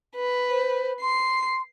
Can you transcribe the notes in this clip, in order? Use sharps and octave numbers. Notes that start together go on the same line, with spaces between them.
B4
C5
C6 C7